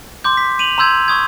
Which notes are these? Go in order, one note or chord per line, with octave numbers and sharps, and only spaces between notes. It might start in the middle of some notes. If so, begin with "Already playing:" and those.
C6 D6 G6
B6
D#7 F7 F#7
A#5 C6 E6 G6 G#6
C#6 D#6 G#6